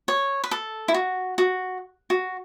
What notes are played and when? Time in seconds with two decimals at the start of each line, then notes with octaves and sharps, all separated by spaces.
0.08 C#5
0.44 B4
0.51 A4
0.88 E4
0.94 F#4
1.38 F#4
2.10 F#4